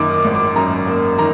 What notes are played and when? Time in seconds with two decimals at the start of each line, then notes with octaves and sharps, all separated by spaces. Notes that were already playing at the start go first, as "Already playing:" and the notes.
Already playing: F#2 D#3 A#3 D6
0.14 D6
0.25 G#1
0.35 D6
0.56 F#2 A#5
0.87 A#3
1.18 D#3 A#5